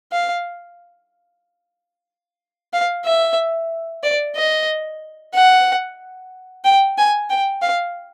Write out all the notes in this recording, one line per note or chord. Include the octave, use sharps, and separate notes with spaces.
F5
F5
E5
D5
D#5
F#5
G5
G#5
G5
F5